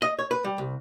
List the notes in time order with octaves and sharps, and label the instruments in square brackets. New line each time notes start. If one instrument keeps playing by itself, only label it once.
[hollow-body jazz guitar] D#5
C#5
B4
G3
C2